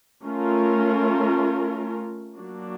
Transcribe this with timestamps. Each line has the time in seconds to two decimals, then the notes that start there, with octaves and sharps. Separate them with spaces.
0.23 A3 C#4 F4 A#4
2.36 F#3 A#3 D4 F#4